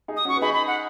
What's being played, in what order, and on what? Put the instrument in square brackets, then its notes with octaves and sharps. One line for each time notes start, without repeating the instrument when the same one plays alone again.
[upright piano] D#4 G#4
[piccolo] D#6
[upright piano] C#4 F#4 [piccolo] C#6
[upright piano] B4
[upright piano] D#4 G#4 [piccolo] B5
[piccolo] B5
F#5